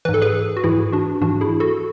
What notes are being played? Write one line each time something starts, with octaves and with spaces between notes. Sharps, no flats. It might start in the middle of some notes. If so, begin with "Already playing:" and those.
G#2 E3 B4
A4
G#4 B4
F#4
G#2 E3 E4 G#4
D4 F#4
G#2 E3 D4 F#4
E4 G#4
F#4 A4